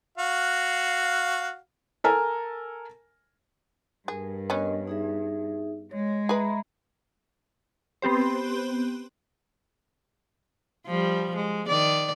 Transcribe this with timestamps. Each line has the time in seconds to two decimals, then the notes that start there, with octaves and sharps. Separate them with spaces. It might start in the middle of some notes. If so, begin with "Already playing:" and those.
0.18 F#4 F5
2.04 A4 A#4 G#5
4.08 G2 G#4 A#4
4.50 B3 C#4 D4 A#4 D#5
4.88 D#4 G#4 E5
5.91 G#3 C#5
6.29 G#4 B4 E5 A#5 B5
8.02 B3 C4 G4 C5
10.86 F3 G3
11.36 G#3
11.68 D#3 D5